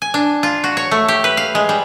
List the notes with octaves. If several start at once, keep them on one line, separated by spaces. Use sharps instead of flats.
G#5
D4
F4
F#4
C#5
A3
G4
B4
F5
G#3
G3